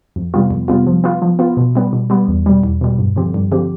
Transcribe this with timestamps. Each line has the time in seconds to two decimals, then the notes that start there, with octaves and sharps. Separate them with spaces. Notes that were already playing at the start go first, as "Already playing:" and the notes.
0.16 F2
0.34 C3 G3 B3 F4
0.51 F2
0.68 C3 G3 B3 F4
0.87 F3
1.04 B3 F4
1.22 F3
1.39 B3 F4
1.57 B2
1.75 G3 B3
1.93 B2
2.10 G3 B3
2.28 E2
2.46 B2 G3
2.63 E2
2.81 B2 G3
2.99 G2
3.16 D3 F3 C4 G4
3.34 G2
3.52 D3 F3 C4 G4